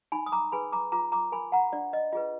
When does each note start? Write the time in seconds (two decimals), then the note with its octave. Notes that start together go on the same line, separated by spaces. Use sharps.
0.12 D#4 G#5 B5
0.26 D#6
0.32 A#5 D6
0.52 G#4 B4 G#5 B5
0.72 A#5 D6
0.92 F4 A#5 D6
1.12 A#5 D6
1.32 A#4 G#5 B5
1.52 F#5 A#5
1.73 D4 D5
1.93 D#5
2.13 F4 G#4 B4 D#5